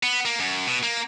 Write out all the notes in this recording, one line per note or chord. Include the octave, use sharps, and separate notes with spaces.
B3
A#3
F#2
B2
A#3